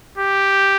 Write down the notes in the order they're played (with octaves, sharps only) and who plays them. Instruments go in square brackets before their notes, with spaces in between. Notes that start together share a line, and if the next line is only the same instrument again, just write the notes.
[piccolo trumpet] G4